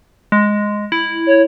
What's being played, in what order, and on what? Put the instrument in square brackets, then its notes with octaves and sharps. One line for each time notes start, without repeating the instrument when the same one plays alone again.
[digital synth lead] G#3
E4
[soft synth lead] C#5